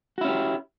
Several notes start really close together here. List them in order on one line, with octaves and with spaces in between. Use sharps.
F#4 E4 C#4 G4